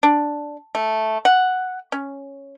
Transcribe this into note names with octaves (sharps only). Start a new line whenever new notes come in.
D4
A3
F#5
C#4